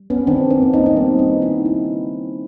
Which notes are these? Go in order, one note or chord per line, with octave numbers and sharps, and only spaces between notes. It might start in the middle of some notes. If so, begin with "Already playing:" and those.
Already playing: G3
B3 C#4
D#3 C4 D4
C4 D4
A#3
C#4 D#4
C4
G3 B3 C#4
C#4 D#4
D#3
D4 E4
C#3 D4 E4